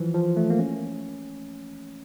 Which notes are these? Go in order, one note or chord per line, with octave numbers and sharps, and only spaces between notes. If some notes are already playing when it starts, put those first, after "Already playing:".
Already playing: E3 F3
F3
A3
A#3
C#4